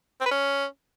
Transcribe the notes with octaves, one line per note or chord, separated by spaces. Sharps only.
C4
B4
C#4